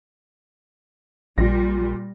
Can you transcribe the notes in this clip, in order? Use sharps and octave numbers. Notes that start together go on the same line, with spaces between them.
A#1 A#2 G3 A#6